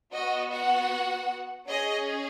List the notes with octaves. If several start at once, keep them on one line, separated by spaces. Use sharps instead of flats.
B3 F#4 D#5
F#4 F#5
C#4 G#4 D#5